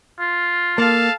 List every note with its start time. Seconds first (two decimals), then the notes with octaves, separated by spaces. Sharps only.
0.20 F4
0.78 A#3 A4 F5 A5